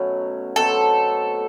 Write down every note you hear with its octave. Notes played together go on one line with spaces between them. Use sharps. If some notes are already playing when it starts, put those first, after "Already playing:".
Already playing: B2 F#3 A3 C#4
B2 F#3 A3 C4 A4